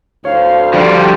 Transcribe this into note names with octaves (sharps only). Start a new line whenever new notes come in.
D2 C5 C#5 F5
D3 F3 G3 D4 D5